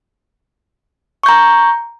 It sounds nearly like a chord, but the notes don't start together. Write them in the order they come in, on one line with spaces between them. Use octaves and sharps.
C#6 G6 A#5